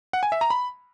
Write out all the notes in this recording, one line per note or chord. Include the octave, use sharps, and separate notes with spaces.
F#5
G#5
E5
A#5
B5